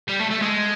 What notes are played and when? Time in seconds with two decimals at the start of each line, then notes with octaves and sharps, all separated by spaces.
0.08 G3
0.20 A3
0.30 A3
0.42 G#3